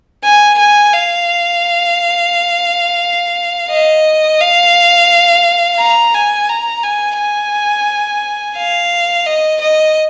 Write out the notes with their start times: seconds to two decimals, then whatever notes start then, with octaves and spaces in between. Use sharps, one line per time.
0.24 G#5
0.59 G#5
0.93 F5
3.71 D#5
4.41 F5
5.79 A#5
6.14 G#5
6.49 A#5
6.83 G#5
7.18 G#5
8.57 F5
9.26 D#5
9.61 D#5